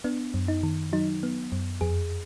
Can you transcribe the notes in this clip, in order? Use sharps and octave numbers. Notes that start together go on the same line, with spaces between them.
B3 D4
F#2
D#4
D#3
F#3 D#4
B3
F#2
F2 G#4